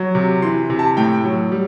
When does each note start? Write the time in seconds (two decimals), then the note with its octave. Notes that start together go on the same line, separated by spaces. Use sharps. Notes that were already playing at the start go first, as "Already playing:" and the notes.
Already playing: F#3
0.15 C3
0.42 E3 C6
0.70 C3
0.79 A5
0.97 A2 G5
1.24 F#3
1.52 G3